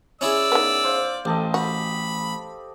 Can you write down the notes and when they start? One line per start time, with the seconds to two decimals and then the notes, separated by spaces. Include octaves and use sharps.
0.21 C#4 E4 G#4 D5 E6
0.52 D#3 B3
0.84 C5 F5
1.25 A1 G4 A4 D#5
1.54 F#4 B5